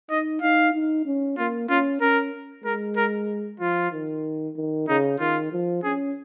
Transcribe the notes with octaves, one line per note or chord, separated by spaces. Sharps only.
D#4 D#5
D#4 F5
D#4
C#4
A#3 F4
C#4 F4
C#4 A#4
G#3 A#4
A#4
F3 F4
D#3
D#3
C#3 D#4
D#3 F4
F3
C#4 G#4